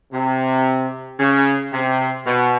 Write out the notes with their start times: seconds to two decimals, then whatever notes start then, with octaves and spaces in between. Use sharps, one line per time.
0.12 C3
1.19 C#3
1.73 C3
2.26 B2